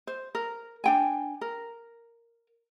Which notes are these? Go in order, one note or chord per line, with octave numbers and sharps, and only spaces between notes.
C5
A#4
D4 G5 G#5
A#4